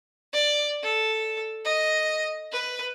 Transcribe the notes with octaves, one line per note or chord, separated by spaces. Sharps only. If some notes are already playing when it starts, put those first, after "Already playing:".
D5
A4
D#5
B4